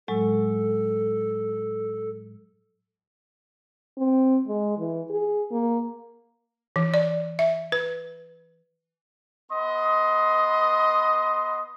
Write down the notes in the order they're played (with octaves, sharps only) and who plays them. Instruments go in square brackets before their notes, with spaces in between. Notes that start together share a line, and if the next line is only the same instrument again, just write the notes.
[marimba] A2 F#3 G#3 [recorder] A4
[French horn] C4
G#3
E3
G#4
A#3
[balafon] E3
D5
E5
B4
[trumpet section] B3 D#5 C6